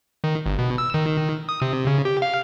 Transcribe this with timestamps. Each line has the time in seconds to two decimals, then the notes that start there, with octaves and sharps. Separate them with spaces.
0.24 D#3
0.46 G1
0.59 B2
0.78 E6
0.94 D#3
1.49 D#6
1.62 C3
1.87 C#3
2.05 G4
2.22 F5